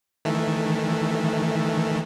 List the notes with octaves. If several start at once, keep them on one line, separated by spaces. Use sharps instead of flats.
D#3 E3 A3